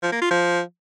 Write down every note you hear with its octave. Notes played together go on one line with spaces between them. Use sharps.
F3
A#3
F4
F3